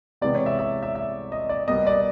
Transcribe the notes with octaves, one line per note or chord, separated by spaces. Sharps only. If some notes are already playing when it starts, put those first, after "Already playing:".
C3 E3 G#3 B3 D5
C#5
E5
E5
E5
E5
D#5
D5
B2 G3 A#3 D#5
D5